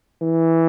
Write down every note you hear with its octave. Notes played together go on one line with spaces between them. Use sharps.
E3